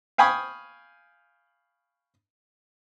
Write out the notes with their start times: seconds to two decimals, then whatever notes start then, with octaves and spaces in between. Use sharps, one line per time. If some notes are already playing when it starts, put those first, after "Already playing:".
0.18 F5 G5 G#5 B5 C#6 D#6